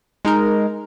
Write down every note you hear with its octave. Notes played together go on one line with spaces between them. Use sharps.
G#3 D#4 A#4